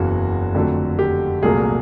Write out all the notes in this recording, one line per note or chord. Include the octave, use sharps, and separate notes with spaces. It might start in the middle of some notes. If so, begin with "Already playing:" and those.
Already playing: F#1 E2 C#3 E3 F#4
F2 D3 F#3 A3
G4
C2 A#2 F#3 A3 G#4